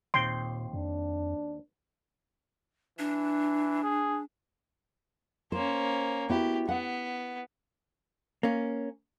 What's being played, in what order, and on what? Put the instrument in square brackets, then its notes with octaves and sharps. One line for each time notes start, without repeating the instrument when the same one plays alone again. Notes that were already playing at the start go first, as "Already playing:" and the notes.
[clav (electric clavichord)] D#2 C4 G5 [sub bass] A#2 [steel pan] C6
[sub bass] F2 [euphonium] D4
[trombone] E3 [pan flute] D4
[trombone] G#4
[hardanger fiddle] A#3 C#4 [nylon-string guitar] C5
[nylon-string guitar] B3 E4 F#4 [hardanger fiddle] G4
[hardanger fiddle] B3 [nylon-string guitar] F#5
[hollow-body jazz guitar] A#3 C#4